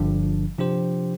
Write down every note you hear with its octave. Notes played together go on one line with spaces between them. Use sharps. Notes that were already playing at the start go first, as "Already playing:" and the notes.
Already playing: G1 G2 D3 F3 D4
C3 F3 D4 G4 C5